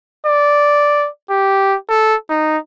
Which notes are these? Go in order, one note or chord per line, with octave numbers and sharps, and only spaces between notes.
D5
G4
A4
D#4